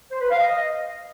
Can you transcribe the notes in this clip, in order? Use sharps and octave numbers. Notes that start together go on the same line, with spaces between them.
C5
B4
F5
D#5